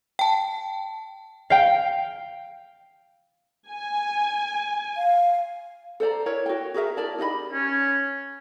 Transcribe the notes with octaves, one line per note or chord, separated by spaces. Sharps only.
G5 A5
F5 G5
G#5
F5
A4 C5 D5 A#5
E4 A#4 C#5
F#4 G5
F#4 G#4 A#4 E5
E4 A#4 D5 A5
D#4 G4 D#5 B5
C#4